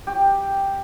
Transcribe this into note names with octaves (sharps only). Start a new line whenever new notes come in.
G4